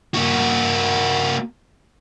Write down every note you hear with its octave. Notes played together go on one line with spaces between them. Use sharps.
A#3 F#4